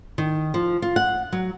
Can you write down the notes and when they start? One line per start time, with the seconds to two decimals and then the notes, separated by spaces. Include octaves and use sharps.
0.18 D#3
0.54 F3
0.82 F4
0.96 F#5
1.32 F#3